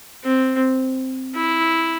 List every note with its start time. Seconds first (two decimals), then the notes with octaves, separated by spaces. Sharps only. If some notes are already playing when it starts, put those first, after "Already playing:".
0.24 C4
1.36 E4